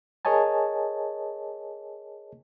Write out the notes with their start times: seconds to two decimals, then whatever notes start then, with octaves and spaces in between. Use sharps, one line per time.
0.25 G#4 A#4 C#5 D#5 G#5 A5